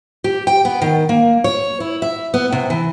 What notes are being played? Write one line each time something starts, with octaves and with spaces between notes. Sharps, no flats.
G4
G5
B3
D#3
A#3
C#5
E4
E5
B3
C3
E3